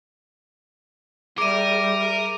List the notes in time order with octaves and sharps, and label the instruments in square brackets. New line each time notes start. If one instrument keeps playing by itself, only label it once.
[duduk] G3 [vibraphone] G#4 E5 [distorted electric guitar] A#4 [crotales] D6 D#7